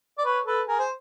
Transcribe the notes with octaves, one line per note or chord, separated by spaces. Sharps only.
D5
B4 C#5
A4 B4
G#4 A#4
C5